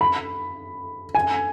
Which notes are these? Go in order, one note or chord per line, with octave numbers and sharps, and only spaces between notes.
B5
G#5